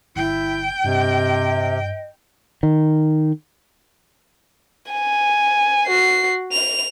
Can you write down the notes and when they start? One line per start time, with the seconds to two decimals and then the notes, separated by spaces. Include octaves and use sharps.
0.16 G1 E4 G5
0.84 G2 C3 D#5
2.63 D#3
4.92 G#5
5.87 F#4 C7
6.53 F7